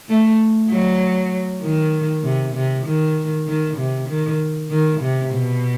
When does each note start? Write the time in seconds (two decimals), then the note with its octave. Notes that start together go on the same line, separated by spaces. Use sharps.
0.09 A3
0.70 F#3
1.62 D#3
2.23 C3
2.54 C3
2.85 D#3
3.47 D#3
3.77 C3
4.09 D#3
4.70 D#3
5.00 C3
5.31 B2